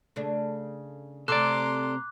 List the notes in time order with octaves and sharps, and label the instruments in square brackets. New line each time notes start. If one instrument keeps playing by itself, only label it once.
[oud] C#3 A3 D4
[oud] C3 A3 [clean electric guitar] A4 D5 [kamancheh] A#5 C6 [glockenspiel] D6 F#6